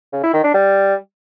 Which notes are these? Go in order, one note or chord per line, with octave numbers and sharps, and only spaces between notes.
C#3
E4
D#3
D4
G3